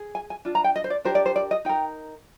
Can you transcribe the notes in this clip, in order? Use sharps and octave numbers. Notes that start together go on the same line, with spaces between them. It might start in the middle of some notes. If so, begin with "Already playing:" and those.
Already playing: G#4
G#5
G#5
D4 F4
A#5
G5
D#5
C5
D5
D4 G4 A#4 C5
D5
C5
D5
D#5
D#4 A#4 G5